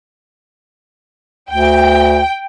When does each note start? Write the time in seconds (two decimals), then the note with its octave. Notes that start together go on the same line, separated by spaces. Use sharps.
1.51 D2 G5